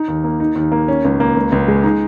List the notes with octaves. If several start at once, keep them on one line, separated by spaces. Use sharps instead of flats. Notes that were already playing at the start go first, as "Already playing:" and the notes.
Already playing: D#4
D#2
A#3
D#4
D#2
A#3
C#4
C#2
A#3
C#2
C#2
G#3
D#4